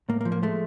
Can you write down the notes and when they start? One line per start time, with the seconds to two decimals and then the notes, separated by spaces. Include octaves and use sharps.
0.09 A2 A#3
0.21 A#3
0.25 F3
0.32 A#3
0.43 G#3 A3